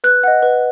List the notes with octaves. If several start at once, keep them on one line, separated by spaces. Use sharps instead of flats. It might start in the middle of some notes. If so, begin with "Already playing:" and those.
B4 F#6
D#5 F#5
B4